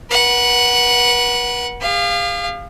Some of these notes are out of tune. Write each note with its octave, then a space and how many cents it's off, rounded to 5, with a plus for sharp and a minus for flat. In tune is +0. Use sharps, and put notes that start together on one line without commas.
B4 -40 F#5 +0
G#4 -45 F5 +0